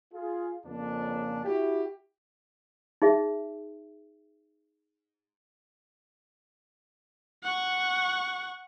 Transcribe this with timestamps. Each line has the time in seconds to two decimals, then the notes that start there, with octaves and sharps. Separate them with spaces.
0.13 F4 G#4
0.66 F2 C#3 A#3 D4
1.44 E4 F#4 G4
3.02 D#4 G#4 E5
7.43 F#5 C#6